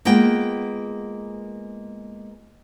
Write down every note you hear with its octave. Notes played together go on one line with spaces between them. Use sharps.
G#3 A#3 B3 F4 G5